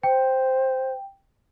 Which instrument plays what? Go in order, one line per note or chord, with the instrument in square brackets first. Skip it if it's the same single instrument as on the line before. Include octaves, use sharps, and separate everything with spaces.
[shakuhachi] C5 [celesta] G5